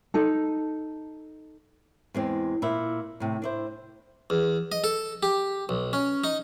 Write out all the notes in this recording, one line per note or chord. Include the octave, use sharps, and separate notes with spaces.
D#4 A4
E2 G#3 C4
A#2 E4
A2 C3
D4 E4 C5
E2
D#5
A4
G4
B1
C#4
D#4